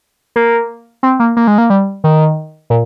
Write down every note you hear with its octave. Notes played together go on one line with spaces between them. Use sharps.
A#3
C4
A#3
A#3
G#3
A#3
G3
D#3
A#2